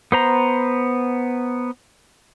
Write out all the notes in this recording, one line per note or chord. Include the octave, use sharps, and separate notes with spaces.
B3 C5 A#5